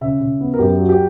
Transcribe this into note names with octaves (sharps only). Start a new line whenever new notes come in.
C#3 E5
C#3
B3
A#4
F#2 G4
F#3
G4